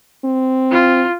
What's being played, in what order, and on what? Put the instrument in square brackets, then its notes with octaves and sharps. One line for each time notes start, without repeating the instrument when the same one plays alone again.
[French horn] C4
[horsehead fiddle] F4